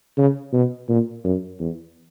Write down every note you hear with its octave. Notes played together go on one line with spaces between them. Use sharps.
C#3
B2
A#2
F#2
E2